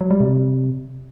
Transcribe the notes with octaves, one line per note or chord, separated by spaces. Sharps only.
F#3
G3
C3